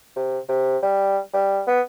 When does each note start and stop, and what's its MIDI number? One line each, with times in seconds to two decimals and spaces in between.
0.16 0.39 48
0.49 0.77 48
0.83 1.18 55
1.34 1.62 55
1.67 1.81 59